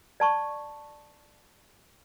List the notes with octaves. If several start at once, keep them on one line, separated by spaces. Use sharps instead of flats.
D5 A5 C#6